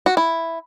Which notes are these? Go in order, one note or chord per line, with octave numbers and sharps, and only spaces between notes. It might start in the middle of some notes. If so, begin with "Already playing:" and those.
F#4
E4